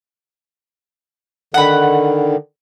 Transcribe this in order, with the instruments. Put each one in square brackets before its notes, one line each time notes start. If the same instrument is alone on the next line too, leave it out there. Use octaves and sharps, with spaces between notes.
[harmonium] D3 D#3 [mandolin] F#5 B5